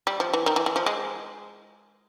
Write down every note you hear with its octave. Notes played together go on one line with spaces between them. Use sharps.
G3
F3
E3
D#3
E3
E3
F3
G#3